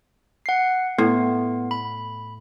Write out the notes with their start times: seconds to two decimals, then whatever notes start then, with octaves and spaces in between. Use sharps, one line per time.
0.46 F#5 C7
0.98 A2 B3
1.71 B5